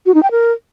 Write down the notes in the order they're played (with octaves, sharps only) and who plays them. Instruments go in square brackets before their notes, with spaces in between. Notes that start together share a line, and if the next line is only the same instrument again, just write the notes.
[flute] F#4
D#4
G5
A#4